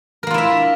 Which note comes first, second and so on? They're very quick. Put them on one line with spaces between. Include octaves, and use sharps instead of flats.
A#4 A#3 F4 E4 E5